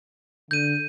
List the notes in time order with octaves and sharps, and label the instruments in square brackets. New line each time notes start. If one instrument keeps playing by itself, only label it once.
[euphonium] D3 [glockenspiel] G6 D#7